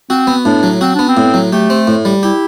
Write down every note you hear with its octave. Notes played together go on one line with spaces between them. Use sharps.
C4 F#4
B3
A2 D4
F#3
C4 F#4
B3 D4
C4
A2
F#3
A3 G4
C4
A2
G3
E4 G4